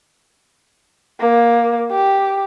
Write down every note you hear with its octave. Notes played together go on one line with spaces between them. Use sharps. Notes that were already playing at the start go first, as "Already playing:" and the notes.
A#3
G4